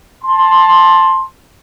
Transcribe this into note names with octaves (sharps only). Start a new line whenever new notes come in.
A5 C6